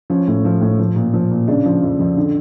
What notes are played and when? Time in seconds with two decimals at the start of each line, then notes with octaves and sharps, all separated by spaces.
0.10 F3 C#4
0.28 A2
0.45 F3
0.61 A2
0.79 F3
0.96 A#2
1.14 F3
1.31 A#2
1.48 C#3 D4
1.65 F3
1.82 F2
1.99 F2
2.17 D3